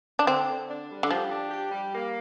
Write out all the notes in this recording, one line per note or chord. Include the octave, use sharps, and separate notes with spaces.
D4
D3 C4
D3
D4
G3
D3
F3 G4
D4
G4
G3
A#3